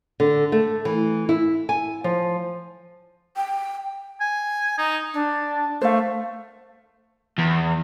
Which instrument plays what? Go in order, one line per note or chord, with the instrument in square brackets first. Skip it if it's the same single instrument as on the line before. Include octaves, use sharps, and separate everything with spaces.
[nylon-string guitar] D3
A3
E3
E4
G#5
F3
[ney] G5
[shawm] G#5
D#4
[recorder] D4
[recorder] A3 [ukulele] C5 F5
[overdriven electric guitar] E2